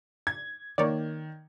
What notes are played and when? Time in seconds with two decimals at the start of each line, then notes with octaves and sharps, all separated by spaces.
0.27 G#6
0.78 D#3 A#3 C#5 D5